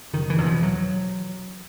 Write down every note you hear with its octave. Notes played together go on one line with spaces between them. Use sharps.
F#1 D#3
E3
E2 B2
F3
F#3